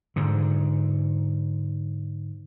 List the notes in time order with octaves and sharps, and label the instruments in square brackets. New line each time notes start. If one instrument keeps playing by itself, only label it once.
[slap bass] G#2 D3